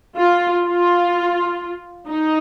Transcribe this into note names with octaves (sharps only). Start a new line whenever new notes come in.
F4
F4
D#4